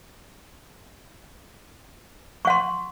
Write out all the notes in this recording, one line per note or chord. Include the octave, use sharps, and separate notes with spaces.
F#5 C6 C#6